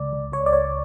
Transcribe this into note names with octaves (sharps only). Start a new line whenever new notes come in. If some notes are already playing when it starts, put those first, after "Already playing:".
Already playing: C#2 D5
C#2
C#2 C#5
D5
C#2 C#5